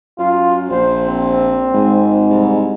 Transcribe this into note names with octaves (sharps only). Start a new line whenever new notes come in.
F#2 F4
A#1 C5
C4
G#1 G#2
C2